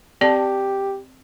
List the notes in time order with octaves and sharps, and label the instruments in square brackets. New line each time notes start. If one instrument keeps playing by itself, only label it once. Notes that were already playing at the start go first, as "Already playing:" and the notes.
[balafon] C4 D5 A5 [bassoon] G4